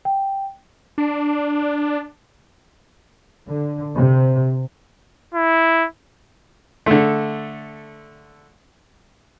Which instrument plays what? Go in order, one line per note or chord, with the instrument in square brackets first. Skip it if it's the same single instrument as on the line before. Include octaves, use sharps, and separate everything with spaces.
[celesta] G5
[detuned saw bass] D4
[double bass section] D3
C3
[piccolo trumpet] E4
[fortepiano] D3 A3